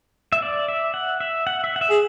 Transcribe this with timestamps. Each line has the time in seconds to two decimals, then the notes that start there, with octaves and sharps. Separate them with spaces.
0.32 E5
0.42 D5
0.68 E5
0.94 F#5
1.20 E5
1.47 F#5
1.64 E5
1.76 F#5
1.81 E5
1.90 G#4